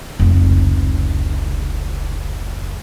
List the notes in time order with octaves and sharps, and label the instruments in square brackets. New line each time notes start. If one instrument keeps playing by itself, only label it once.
[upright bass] F1 C#2